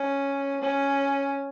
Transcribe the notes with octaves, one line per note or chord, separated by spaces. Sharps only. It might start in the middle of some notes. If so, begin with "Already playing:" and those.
Already playing: C#4
C#4